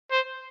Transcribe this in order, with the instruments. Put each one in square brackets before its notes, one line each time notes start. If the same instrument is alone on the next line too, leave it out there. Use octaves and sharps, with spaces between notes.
[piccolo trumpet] C5